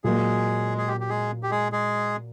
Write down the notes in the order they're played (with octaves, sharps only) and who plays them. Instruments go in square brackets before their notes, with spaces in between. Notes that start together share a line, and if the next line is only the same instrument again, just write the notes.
[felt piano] A#2 F#3 A#3 [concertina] G#3 G#4
[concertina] G#4
G4
G4
G#3 G#4
G4
G#3 G#4
G#3 G#4